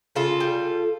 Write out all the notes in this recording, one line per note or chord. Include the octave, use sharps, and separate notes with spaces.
C#3 F4 A4
G3